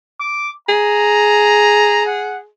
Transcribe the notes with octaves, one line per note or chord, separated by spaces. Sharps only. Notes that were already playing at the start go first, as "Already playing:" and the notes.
D6
G#4 A#5
F#5